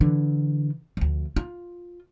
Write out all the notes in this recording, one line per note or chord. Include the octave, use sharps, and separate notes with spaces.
D3 E3
D2 F3
F4